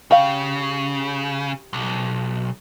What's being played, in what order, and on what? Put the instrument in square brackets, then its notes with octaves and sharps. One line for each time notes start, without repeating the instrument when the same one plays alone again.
[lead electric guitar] C#3 [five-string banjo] G4 F5
[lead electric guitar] B1